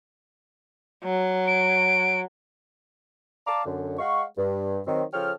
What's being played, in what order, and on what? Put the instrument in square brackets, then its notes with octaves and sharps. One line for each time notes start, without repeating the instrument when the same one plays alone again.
[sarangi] F#3
[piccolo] D7
[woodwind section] D5 F5 A5 A#5 D6
F#2 D3
G#3 F5 F#5 C#6
G2
D#3 F#3 C4
C#3 F3 A4 C#5 G5 F6